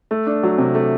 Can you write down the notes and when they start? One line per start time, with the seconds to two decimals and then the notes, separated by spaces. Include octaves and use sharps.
0.11 A3
0.26 D4
0.43 F#3
0.58 C3
0.75 A3